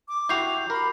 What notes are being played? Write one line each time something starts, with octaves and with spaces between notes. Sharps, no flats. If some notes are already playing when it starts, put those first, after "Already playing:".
D6
E4 F#4 G4 G6 C7 F7
A#4 B5